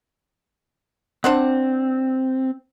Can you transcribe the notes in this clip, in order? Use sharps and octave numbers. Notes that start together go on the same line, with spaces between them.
C4 D4 C5 F#5